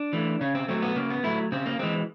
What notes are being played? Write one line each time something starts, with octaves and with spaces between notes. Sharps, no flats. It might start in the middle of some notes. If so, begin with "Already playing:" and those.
Already playing: D4
E3 A3
C#3 C#4
C4
F#3 A3 C4
B3
C#3 A#3
B3
F#3 A3 E4
C#3 C4
A#3
E3 G#3 C4